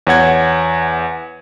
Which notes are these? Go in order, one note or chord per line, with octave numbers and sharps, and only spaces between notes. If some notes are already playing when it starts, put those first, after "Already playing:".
E2 C#5 F#5 G#6